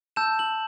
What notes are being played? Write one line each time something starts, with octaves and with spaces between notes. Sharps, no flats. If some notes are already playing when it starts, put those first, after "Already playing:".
A5 E6 G6 E7
F#7